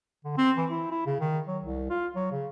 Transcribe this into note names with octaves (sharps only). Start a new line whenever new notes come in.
D3
C4
E3
E4
E4
C#3
D#3
F#3
C2
F4
F#3
C#3